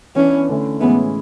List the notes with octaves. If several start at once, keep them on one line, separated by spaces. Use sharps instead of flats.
E3 B3 C#4 D4
D3 A3 C#4 E4
A2 E3 G#3 B3 C#4 E4